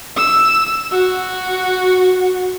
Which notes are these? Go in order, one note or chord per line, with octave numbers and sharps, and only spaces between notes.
E6
F#4